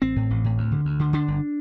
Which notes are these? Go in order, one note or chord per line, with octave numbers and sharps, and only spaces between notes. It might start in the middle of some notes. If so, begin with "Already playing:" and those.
A1 C4
A2
A1
A2
D2
D3
D2
D3
D3 D4
G1